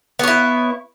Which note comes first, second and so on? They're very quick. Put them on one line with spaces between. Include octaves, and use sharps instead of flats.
B3 C#5 E4